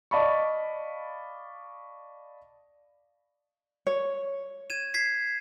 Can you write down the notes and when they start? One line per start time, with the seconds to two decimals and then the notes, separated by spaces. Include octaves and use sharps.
0.11 D5 D#5 F5 A5 B5 C#6
3.87 C#5
4.70 G#6 D#7 E7
4.94 G#6 B6 C7